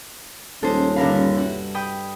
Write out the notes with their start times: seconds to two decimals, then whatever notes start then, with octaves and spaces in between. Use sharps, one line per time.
0.63 D#1 G#3 C#4 A4 C5
0.96 G2 D3 A#4 F5 B5
1.35 C3 F#4
1.74 G5 B5 D#6